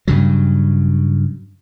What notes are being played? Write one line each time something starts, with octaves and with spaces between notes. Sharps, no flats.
G2 C#3 F#3